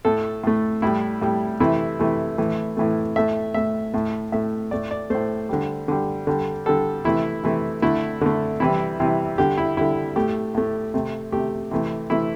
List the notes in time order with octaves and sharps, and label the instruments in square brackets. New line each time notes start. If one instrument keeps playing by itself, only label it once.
[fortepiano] A2 A3 A4
A2 A3
A2 G3 E4
A2 G3
C3 E3 A3 E4
C3 E3 A3
A2 E3 A3
A2 E3 A3
A2 A3 E5
A2 A3 E5
A2 A3
A2 A3 E5
A2 A3 D5
D5
A2 A3 C5
D3 G3
D3 G3
D3 G3
D3 G3 A4
C3 E3 A3 E4
C3 E3 A3
D3 A3 E4
D3 A3
C3 E3 G3 E4
C3 E3 G3
D3 G3 G4
E4
D3 G3 E4
A2 A3 G4
A2 A3
C3 A3
C3 A3 G4
C3 E3 A3
C3 E3 A3 E4